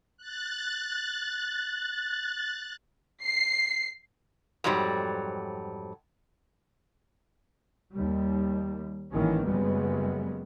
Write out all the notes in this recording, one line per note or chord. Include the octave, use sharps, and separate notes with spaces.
F#6 A6
C7
F2 G#2 F#3 G3
D#2 G3
A1 G#2 D#3 E3 A#3 C#4
F#1 F#2 C#3 G3 G#3 B3